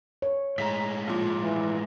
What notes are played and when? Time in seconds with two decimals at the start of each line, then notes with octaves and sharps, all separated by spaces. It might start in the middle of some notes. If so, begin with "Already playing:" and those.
0.22 C#5
0.58 A2 G#3 A#5 B6
1.08 A#2 F3
1.43 E3